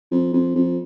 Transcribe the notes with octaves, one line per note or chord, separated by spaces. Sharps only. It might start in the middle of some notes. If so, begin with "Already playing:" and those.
F2
F2
F2